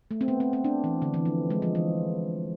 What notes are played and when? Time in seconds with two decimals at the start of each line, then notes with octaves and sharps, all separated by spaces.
0.11 A3
0.21 C4
0.28 B3
0.40 C4
0.53 C4
0.64 D4
0.84 E3
1.02 D3
1.14 E3
1.25 F3
1.50 G#3
1.62 F3
1.75 E3